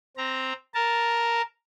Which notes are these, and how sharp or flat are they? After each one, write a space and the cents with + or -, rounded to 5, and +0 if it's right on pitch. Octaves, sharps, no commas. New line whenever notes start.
C4 +0 A#5 +0
A#4 +0 A5 +0